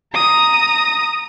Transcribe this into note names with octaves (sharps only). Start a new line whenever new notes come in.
A#5 D#6